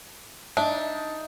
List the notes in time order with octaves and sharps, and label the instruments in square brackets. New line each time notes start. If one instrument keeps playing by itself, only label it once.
[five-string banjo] D4 [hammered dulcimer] D#4 [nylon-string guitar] E5